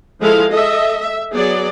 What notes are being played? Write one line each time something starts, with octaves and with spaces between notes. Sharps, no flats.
F3 G#3 E4 A4 F5
A4 D#5 E5
E5
F#3 B3 G#4 D5